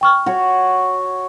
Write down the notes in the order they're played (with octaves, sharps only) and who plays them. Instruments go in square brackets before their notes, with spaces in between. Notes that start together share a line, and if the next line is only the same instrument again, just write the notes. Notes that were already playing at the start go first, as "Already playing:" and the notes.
[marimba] G5 C#6 F6
[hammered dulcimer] F#4 C#5